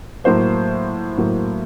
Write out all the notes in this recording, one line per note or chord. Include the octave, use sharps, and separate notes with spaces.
A2 F#3 A#3 C5
A2 F#3 A#3